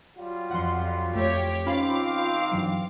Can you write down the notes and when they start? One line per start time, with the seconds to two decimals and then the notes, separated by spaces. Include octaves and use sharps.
0.17 F#3 G3 F4
0.51 F2 F#5 C6
1.15 F2 A3 G4 C#5
1.66 D#3 C4 C#4 F4 F5 B5 D6
2.51 G2 E3 F#3